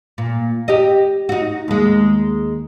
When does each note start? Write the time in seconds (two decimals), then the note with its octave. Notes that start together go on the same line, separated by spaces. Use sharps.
0.18 A#2
0.68 G4 D#5
1.29 D#4 F#4
1.68 D#2 G#3